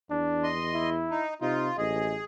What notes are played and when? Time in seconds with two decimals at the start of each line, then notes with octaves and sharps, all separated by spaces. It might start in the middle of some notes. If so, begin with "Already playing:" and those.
0.10 E2 D4
0.43 D#5 C6
0.74 E4
1.11 D#4
1.42 C3 D#4 F4
1.78 A1 G#4 D#5